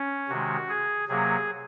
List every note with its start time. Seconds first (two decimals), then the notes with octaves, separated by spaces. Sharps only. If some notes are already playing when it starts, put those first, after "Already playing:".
Already playing: C#4
0.29 C3 D#3 G#3 F#4
0.69 G#4
1.08 C3 F#3 A#3 G#4